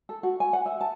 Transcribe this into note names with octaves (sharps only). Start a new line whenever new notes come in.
A4
F#4
G#5
F#5
E5
A5